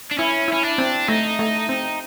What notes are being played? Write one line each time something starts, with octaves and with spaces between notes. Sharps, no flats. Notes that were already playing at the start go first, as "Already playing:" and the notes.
D4
C#4 E4
E4
C#4
D4
C4
A3 D#4
A3
C4